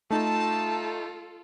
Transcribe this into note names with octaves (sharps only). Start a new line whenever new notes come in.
A3 D#4 F4 A4 A5